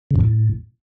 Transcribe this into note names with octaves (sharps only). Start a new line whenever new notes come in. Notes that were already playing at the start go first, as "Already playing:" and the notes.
C#3
F#2
A2